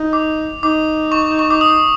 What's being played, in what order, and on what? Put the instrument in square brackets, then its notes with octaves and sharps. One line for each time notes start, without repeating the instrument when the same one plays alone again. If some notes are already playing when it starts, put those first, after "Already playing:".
Already playing: [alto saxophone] D#4
[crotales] D6
[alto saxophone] D#4 [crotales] D6
[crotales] C#6
C#6
D6
D#6